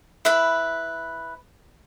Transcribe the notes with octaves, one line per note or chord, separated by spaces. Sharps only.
E4 B4 B5